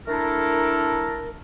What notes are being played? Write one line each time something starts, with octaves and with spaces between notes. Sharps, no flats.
A3 D4 E4 A4 A#4